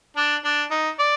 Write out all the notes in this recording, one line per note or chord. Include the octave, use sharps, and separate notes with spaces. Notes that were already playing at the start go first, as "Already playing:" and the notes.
D4
D4
D#4
D5